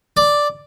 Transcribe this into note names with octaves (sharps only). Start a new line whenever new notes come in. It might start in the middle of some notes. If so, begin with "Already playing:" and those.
D5